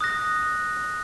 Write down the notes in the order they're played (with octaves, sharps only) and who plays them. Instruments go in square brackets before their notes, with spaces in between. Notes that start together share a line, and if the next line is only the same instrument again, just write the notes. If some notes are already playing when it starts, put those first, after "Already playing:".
[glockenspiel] D#6 F#6 A#6